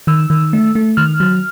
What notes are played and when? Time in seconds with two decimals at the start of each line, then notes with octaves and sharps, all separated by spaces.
0.07 D#3 E6
0.30 D#3
0.53 A3
0.75 A3
0.97 D#3 F6
1.20 F#3